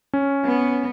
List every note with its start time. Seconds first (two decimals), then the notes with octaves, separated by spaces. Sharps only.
0.13 C#4
0.45 B3